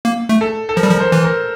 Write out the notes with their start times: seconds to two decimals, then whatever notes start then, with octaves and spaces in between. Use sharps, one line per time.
0.05 A#3
0.29 A3
0.41 A4
0.69 A4
0.76 F3 A#4
0.83 G3
0.90 F3
0.93 A#4
1.00 C5
1.12 E3
1.24 A#4